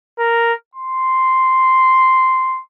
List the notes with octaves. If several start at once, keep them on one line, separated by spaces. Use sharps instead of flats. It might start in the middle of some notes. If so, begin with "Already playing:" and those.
A#4
C6